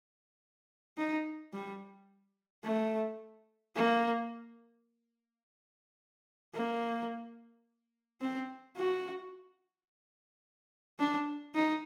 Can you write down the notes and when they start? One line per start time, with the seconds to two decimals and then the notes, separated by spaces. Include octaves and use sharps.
0.98 D#4
1.53 G3
2.65 A3
3.76 A#3
6.54 A#3
8.21 C4
8.77 F#4
10.99 D4
11.55 D#4